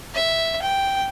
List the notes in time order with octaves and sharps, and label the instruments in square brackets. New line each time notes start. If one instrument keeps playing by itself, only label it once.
[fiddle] E5
G5